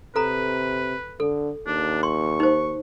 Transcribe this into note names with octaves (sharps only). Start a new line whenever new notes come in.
C3 A4 B4 A#5
D3 A4
D#2 D4
C6 C#6
D#4 C5